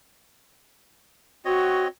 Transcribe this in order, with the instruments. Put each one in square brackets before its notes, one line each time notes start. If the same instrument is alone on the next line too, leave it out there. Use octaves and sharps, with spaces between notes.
[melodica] C4 C#5 D#5 [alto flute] F#4